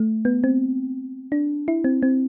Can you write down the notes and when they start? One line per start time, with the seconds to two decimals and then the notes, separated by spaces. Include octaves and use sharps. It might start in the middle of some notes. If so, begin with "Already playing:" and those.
Already playing: A3
0.25 B3
0.44 C4
1.32 D4
1.68 E4
1.84 C4
2.03 C4